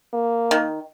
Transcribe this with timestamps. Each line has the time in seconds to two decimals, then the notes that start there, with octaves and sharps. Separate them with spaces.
0.13 A#3
0.51 D#3